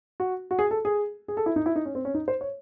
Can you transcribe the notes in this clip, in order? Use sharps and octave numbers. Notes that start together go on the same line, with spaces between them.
F#4
F#4
G#4
A4
G#4
G#4
A4
E4
D#4
E4
D#4
C#4
C4
C#4
D#4
C5
C#5